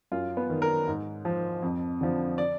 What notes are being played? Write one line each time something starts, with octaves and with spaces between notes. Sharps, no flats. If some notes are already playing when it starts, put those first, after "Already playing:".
F#2 F4
B3
D#3
A#4
G#2
F3
F2
D3 F3
D5